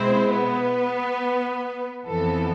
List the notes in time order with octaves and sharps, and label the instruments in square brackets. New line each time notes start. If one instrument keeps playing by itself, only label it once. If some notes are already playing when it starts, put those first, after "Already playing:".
Already playing: [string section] B2 G#3 C4 E4 C5
B3 B4
F2 E3 B3 A4